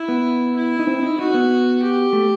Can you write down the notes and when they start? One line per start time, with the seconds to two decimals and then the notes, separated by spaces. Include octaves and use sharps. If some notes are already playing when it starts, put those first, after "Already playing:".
Already playing: E4
0.08 B3
0.56 E4
0.79 D#4
0.87 C4
1.03 D#4
1.19 D#4 F#4
1.34 B3
1.82 G4
2.13 A3